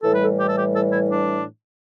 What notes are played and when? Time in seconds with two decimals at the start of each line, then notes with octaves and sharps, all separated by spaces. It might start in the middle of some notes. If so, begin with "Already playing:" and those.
0.02 A2 E3 G3 A4
0.13 B4
0.24 A4
0.38 G4
0.48 A4
0.57 G4
0.74 A4
0.91 E4
1.10 D4